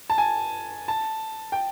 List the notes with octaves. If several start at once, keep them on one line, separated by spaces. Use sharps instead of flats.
A5
G#5
A5
G5